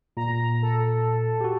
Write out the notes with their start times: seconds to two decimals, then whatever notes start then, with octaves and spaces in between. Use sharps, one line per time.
0.17 A#2 A#5
0.62 A4
1.41 F#4 G4